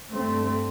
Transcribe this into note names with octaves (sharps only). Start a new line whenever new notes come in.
G2 A3 C4